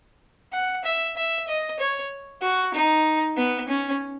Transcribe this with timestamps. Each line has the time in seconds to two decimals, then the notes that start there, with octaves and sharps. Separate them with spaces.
0.53 F#5
0.85 E5
1.16 E5
1.48 D#5
1.80 C#5
2.42 F#4
2.74 D#4
3.37 B3
3.69 C#4